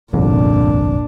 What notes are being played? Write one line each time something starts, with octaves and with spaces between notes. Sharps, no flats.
G1 C2 F2 A#2 D4